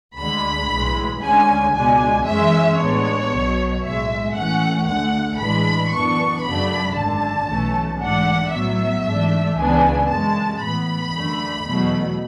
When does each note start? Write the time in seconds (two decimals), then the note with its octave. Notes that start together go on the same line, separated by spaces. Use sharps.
0.17 D2 D3 G#3 B5
0.69 B1 A2 E3 G#3
1.21 D2 D3 G#3 C#4 G#5
1.74 C#2 B2 G#3 D4 G#5
2.25 F#2 E3 G#3 C#4 E5
2.78 A1 A2 G#3 B3 D4 C#5
3.30 B1 B2 F#3 B3
3.82 B1 A2 G#3 E5
4.34 A2 E3 A3 C#4 F#5
4.86 D2 D3 A3 F#5
5.39 A1 A2 E3 G#3 D4 B5
5.90 F#2 E3 B3 D4 C#6
6.43 F#2 C#3 F#3 A3 D4 B5
6.95 G#1 F#2 D3 A5
7.47 B1 A2 E3 A3 C#4
7.99 G#2 E3 A3 D4 F#5
8.51 A2 F#3 B3 E5
9.03 G#2 E3 A3 D4
9.56 C#2 C#3 E3 B3 D4 G#5
10.08 F#2 C#3 G#3 A5
10.60 A2 E3 B3 B5
11.13 F#2 D3 A3
11.65 E2 B2 F#3 A3